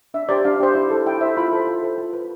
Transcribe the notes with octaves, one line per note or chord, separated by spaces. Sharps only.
D4 E5
G4 C5 D5
D4 F5
G4 C5
E4
A4 C5
E4 G5
C5 E5
A4
F4 B5
A4 C5
F4
A4 C5
F4
B4